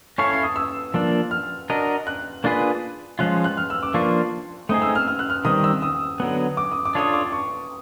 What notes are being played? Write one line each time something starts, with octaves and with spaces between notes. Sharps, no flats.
C#4 E4 A4 C#5 F5 C#6
C#6
D#6
E6
F3 A#3 D4
F6
D4 F#4 A#4 D#5
F#6
A#3 D4 F4 G#4 B4
F3 G#3 C#4 F4 F#6
F#6
F6
E6
D6
F3 A#3 D4 F4 C#6
A3 C4 D#4 G#4 D#6
E6
F6
F6
F#6
F6
D#3 G3 C4 D#6
E6
D#6
D3 F#3 B3
D6
D#6
D6
D4 F4 A4 C#5 D#6
D6
C#6